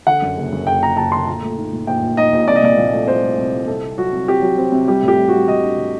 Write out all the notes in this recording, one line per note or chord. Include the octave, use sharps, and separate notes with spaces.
D3 F#5
F#2
F#1
F#2
F#1 G5
F#1 A#5
F#1 A5
D3 C6
A#2 A#5
A3
D#4
A#2
A#1 G5
A#1
D#4 D#5
A#1
C2 D5
D#5
A#2 D5
A#2
A3
C2 C5
A3
C2
A3
C2 A4
C4
F#3 F#4
C2
C4 G4
F#3
C4
C3
G3 G4
A2
G4
G3
G3 F#4
A2 D#5
D4
A2